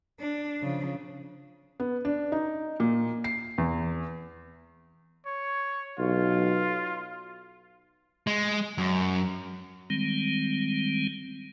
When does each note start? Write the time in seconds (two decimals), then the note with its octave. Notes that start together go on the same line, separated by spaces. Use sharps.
0.20 D4
0.62 C#3 F3
1.80 B3
2.05 D4
2.32 D#4
2.80 A#2
3.24 C7
3.58 E2
5.26 C#5
5.99 B1 F4
8.27 G#3
8.78 F#2
9.90 D#3 G3 G#3 C4